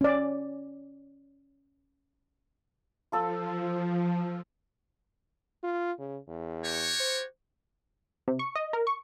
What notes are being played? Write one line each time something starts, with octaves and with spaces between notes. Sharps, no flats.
C#4 D5
F3 F4 A4 E6
F4
C#3
E2
F#4 G4 C#5
C5
C3
C#6
D#5
A#4
C#6